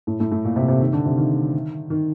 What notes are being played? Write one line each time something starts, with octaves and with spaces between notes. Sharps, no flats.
A2
A2
A2
A#2
C3
C3
D#3
D3
C3
D#3
D#3